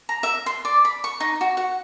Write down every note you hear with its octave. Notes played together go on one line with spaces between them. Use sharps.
A#5
E5
C6
D5
B5
C#6
D#4
F#4
F#5